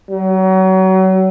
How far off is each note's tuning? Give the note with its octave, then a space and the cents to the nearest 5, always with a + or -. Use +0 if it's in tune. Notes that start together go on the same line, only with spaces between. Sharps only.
F#3 +30